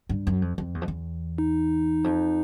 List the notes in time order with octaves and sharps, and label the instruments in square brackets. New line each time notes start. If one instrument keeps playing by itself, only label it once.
[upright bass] G2
F#2
F2
F2
E2
F2
E2
[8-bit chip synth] D#4
[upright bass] F2